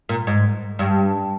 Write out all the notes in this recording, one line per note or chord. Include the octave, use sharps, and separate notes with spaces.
A#2
G#2
G2